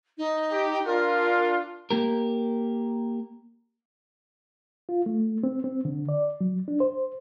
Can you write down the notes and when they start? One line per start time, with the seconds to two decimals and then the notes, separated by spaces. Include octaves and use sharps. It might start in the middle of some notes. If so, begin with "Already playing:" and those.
0.18 D#4
0.51 G4
0.85 D4 F4 A#4
1.91 A#3 G4 A#4
4.89 F4
5.06 A3
5.43 C4
5.64 C4
5.85 D3
6.09 D5
6.41 F#3
6.68 D4
6.80 C5